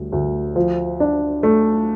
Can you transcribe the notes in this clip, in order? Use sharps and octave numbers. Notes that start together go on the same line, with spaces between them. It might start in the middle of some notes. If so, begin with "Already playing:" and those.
Already playing: D2 G3
D2
F3
D4
A3